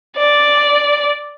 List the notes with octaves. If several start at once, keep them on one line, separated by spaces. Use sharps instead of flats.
D5